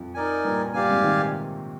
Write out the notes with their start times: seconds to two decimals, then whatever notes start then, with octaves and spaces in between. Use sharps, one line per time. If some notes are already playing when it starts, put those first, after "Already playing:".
Already playing: F2
0.14 D#4 A#4 D5 G#5
0.44 G2 A#2
0.73 G2 A#2 G4 D5 F5 G#5
0.89 G#2 C3
1.03 C3 D#3